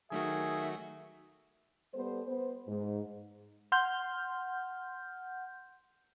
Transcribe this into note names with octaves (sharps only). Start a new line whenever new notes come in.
D#3 F#3 A3 F#4 G#4 E5
G3 B3 A4 C5
B3 C5
G#2
F#5 C6 F6 G6